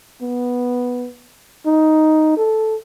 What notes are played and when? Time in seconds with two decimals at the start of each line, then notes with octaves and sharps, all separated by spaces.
0.22 B3
1.66 D#4
2.37 A4